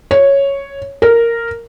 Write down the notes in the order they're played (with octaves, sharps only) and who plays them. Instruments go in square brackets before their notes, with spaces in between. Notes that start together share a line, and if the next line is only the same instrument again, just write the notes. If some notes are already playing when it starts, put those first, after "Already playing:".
[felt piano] C#5
A#4